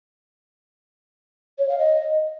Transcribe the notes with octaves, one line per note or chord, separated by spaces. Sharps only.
C#5
F5
D#5